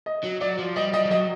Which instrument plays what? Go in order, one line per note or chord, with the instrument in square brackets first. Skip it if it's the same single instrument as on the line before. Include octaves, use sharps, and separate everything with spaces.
[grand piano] D#5
[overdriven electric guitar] F#3
[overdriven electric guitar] F#3 [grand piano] D5
[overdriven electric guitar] F3
[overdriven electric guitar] G3 [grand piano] D#5
[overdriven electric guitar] G3 [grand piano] D#5
[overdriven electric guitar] F3
[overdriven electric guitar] F#3 [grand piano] D#5